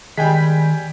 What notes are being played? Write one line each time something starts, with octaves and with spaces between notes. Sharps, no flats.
D#3 G3 G#3 G5 G#5 B6